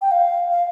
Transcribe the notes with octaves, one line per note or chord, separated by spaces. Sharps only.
G5
F5
F5